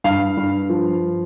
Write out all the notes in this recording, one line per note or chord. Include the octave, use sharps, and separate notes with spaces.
G2 F5
G2
F3